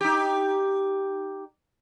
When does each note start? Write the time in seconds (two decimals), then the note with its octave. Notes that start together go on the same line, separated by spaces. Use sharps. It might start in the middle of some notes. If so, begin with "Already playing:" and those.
0.01 D#4 G4